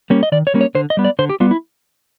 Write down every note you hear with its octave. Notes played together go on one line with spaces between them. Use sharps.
G3 A#3 C#4
D#5
D#3 D5
C#5
G3 A#3 C#4
C#5
D3 C5
D#5
G3 B3
D5
D3 C5
G4
G3 B3 F4
E4